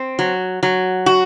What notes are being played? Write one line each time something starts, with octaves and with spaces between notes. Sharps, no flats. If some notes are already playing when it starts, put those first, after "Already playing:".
Already playing: C4
F#3
F#3
F#4